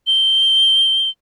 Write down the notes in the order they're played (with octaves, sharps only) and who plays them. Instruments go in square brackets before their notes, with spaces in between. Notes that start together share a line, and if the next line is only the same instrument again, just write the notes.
[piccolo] G7